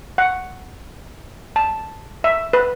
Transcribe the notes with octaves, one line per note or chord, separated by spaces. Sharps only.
F#5
A5
E5
B4